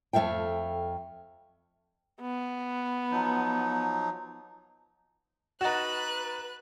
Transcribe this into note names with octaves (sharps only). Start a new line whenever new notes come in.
F2 A3 E5 F5 G5
B3
F3 F#3 D#4
D#4 F#4 B4 A#5 F#6 A6 E7